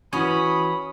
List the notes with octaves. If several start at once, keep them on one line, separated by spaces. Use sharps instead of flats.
E3 C#4 F#4 G#5 B5 D#6